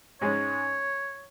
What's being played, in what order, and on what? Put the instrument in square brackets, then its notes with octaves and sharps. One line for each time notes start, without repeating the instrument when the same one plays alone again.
[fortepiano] G#2 G#3 C#4 [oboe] C#5